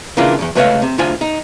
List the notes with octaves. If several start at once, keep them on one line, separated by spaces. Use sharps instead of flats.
C#3 E3 A#3 D4 F4
B1 E2
C#2 A3 B4 C#5 D#5 F5
C3
D2 D3 F4 C5 G#5
D#4